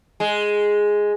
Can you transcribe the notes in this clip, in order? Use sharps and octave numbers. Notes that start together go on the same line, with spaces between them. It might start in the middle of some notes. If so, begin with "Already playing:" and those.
G#3